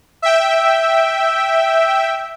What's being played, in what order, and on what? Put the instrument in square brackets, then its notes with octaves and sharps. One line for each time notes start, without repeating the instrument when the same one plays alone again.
[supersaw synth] E5 G5